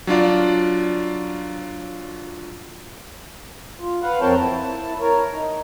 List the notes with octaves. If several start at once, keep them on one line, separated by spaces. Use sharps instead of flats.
F#3 D4 F4 D5
F4
B4 F5 F#5
F2 C4 A#4 C#5 G5 A5
E4 A5
A#4 C#5
D#4